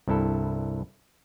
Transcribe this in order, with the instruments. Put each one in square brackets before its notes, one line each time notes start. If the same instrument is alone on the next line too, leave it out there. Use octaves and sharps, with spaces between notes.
[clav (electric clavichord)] C2 G2 E4 A4